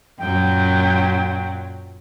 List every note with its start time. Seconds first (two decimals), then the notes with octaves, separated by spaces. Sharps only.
0.19 F#2 A#2 F#3 G5